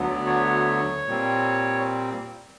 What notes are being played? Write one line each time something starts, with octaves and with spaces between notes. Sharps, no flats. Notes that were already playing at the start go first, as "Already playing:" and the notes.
Already playing: D2 D3 F#3 B3
D5
C#5
A#2 G3 C4